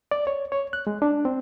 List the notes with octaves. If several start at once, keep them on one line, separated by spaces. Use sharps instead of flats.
D5
C#5
C#5
F#6
G#3
D4
C4